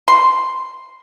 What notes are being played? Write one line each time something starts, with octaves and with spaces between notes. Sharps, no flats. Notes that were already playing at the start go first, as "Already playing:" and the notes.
C6